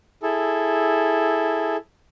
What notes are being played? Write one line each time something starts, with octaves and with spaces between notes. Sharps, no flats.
E4 G#4 A4